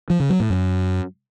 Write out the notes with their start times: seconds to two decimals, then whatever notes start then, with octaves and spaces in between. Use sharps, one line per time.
0.10 F3
0.20 C#3
0.30 F#3
0.40 A2
0.50 F#2